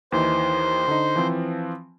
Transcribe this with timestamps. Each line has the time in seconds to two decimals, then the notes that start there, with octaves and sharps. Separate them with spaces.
0.12 D#2 E3 D#4 C5
0.88 D3 D#4
1.16 E3 F3 C4